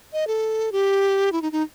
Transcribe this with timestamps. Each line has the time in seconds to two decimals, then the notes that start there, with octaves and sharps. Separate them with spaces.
0.13 D#5
0.27 A4
0.72 G4
1.32 E4
1.42 D#4
1.52 D#4